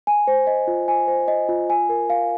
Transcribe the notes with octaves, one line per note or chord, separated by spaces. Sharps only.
G#5
C5
D#5
F4
G#5
C5
D#5
F4
G#5
A#4
F5